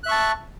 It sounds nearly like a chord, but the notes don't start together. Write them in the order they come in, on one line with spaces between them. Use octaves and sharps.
F#6 E5 C#6 A5